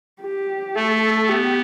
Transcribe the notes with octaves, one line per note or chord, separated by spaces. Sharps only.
G4
A3 A4
B3 G4